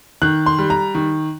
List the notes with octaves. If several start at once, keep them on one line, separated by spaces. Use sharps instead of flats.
D#3 F#6
C6
G3
A#5
D#3